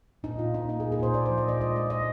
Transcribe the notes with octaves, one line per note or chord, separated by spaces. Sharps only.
A#2 D#4
A#2 F4
A#2 D#4
A#3 D#4
G#4
A#2
G#4
A#2 C5
A#2 D5
C5
F3
D#5
A#2 D5
G#3 D#5
G#3 D#5
A#2 D#5